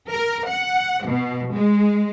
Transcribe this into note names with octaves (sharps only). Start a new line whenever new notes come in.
A#4
F#5
B2
G#3